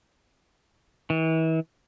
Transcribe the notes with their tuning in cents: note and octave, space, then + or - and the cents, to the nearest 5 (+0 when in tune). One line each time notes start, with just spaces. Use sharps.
E3 -35